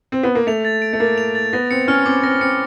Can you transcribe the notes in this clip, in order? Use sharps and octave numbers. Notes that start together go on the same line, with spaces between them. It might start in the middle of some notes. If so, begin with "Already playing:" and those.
C4
B3
A#3
A3 F7
A6
D7
A3
A#3 A6
F7
A6
B3 A#6
C4 C#7
C#4 F6
C4 D6
C4 A#6
C4 C#7